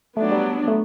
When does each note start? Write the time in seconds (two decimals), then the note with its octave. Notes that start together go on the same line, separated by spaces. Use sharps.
0.17 F#3 A3 B3 D4
0.32 G3
0.68 A3